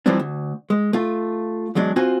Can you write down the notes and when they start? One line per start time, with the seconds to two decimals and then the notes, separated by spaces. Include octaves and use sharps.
0.06 F#2 E3 F3 G3 C4 D4
0.20 D2
0.70 G#3
0.93 A3 F4
1.75 E2 F#3 G#3 D4
1.96 C4 F4 F#4 C5 G#5